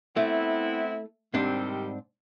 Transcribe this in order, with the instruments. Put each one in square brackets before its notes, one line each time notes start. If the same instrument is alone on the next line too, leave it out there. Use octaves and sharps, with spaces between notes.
[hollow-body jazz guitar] A3 [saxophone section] B3 C4 E4
[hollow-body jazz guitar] G#2 C4 D4 [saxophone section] C3 D#3 G3